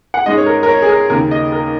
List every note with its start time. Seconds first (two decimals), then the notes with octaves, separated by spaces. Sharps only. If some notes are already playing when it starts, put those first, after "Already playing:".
0.14 F#5
0.26 G#2 G#3 C#4 D#5
0.37 C#5
0.46 A#4
0.63 A#4
0.68 C#5
0.82 G#4
0.89 A#4
1.10 D#2 C#3 A#3 A#4
1.31 D#5
1.52 A#4